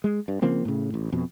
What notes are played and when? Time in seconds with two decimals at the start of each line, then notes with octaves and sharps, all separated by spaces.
0.04 G#3
0.28 G2
0.42 C#3 F3 A#3 C4
0.65 A2 C#3
0.94 A1
1.12 F2 B2